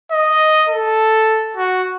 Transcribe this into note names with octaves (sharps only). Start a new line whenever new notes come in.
D#5
A4
F#4